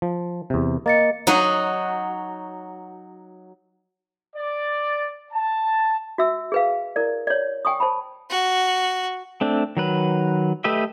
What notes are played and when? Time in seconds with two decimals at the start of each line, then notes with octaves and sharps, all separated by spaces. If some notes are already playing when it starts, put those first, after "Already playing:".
0.02 F3
0.50 E2 C3
0.86 A#3 D#5 A6 C#7
1.27 F#3 D#4 F#4
4.36 D5
5.33 A5
6.18 F#4 E5 E6
6.52 G#4 B4 F5
6.96 E4 A#4 D5
7.27 C#5 D5
7.65 G5 G#5 C#6 D#6
7.80 C5 A5 B5
8.30 F#4
9.41 A3 C4 D4
9.77 D#3 F#3 B4
10.64 A3 G4 B4 D#5 E5